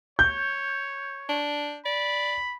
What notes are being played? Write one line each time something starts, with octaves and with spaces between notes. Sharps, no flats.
C#5 G6
D4
D5 B5